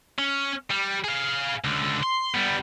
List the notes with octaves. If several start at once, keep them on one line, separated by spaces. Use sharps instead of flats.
C#4
G3
G#4 F5
C#2 D3
C6
G3 B3